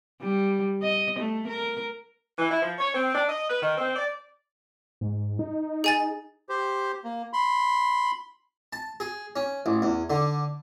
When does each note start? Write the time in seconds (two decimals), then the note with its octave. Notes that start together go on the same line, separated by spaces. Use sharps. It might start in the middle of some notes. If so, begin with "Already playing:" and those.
0.21 G3
0.82 D#5
1.19 A3
1.48 A#4
2.38 E3
2.50 E4
2.62 F3
2.78 C#5
2.94 C4
3.15 D4
3.29 D#5
3.50 B4
3.62 D#3
3.78 C4
3.96 D5
5.01 G#2
5.39 D#4
5.84 G#4 G#5 A6
6.49 G4 C5
7.04 A#3
7.33 B5 C6
8.73 A5
9.00 G#4
9.36 C#4
9.66 A1
9.82 E2
10.10 D3